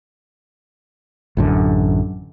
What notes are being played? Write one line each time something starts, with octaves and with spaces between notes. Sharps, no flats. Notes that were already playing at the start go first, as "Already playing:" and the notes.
A1 F#2 D3